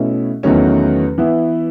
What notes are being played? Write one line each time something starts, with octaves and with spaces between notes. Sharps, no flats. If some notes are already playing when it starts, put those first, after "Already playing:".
Already playing: B2 A3 C#4 E4
E2 D#3 F#3 A3 C#4
E3 B3 E4